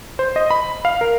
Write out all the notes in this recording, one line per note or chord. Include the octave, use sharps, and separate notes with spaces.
C5
D#5
B5
F5
A#4